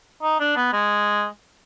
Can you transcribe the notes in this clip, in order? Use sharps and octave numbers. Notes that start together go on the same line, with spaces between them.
D#4
D4
B3
G#3